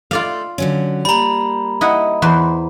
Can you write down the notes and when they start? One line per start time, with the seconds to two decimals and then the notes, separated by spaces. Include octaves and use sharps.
0.11 A3 F4 A4 D5 F5
0.58 D3 F#3 C#4
1.05 G3 A#3 A#5 B5
1.81 E4 D#5 F#5
2.22 E2 B4 C5